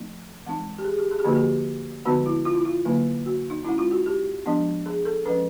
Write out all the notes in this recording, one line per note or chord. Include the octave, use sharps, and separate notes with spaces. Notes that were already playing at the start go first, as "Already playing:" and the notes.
Already playing: F3 A3 C4 D#4
E3 G#3 C4 D#4
G4
G#4
G4
G#4
G4
D3 F3 A#3 D#4 F#4
G4
D3 F3 G#3 B3 D#4 F#4
E4
F4
E4
F4
D3 F#3 A#3 D#4
F#4
D#4
G#3 C#4 E4
F4
F#4
G4
F3 G#3 B3 D4
G#4
A4
F3 G#3 C#4 B4